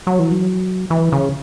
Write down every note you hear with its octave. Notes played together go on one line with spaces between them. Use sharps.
F#3
E3
F#3
E3
C#3